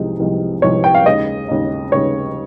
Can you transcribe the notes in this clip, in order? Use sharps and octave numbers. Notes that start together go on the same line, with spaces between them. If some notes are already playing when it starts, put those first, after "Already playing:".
Already playing: C2 C3 F3 G#3 D#4
C2 C3 F3 G#3 D#4
C2 C3 F3 G#3 D#4 C#5
G5
F5
D#2 C#3 G#3 D#4 D#5
D#2 C#3 G#3 D#4
D#2 C#3 G#3 D#4 C#5